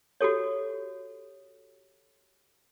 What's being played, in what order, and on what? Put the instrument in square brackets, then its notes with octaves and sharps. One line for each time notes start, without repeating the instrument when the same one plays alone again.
[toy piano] F#4 G4 A4 C#5